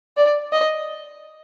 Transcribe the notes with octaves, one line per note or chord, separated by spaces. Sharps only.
D5
D#5